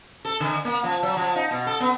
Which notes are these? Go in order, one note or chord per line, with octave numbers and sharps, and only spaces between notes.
A4
D3
A#3
F3
F#3
F3
D#4
B2
A4
B3